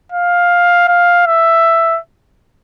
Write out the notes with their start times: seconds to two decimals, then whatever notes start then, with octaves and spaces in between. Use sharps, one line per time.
0.12 F5
0.88 F5
1.27 E5